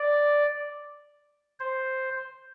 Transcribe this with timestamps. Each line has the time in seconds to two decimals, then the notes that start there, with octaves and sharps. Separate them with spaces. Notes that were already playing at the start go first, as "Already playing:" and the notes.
Already playing: D5
1.60 C5